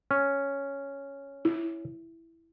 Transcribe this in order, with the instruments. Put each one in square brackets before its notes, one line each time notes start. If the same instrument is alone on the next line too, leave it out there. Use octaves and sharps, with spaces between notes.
[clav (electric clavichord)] C#4
[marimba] E4